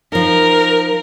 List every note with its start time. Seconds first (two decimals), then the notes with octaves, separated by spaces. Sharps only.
0.12 F3 D#4 A#4